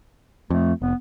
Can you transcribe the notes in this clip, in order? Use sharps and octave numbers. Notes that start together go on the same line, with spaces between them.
F2 A3
F1 B3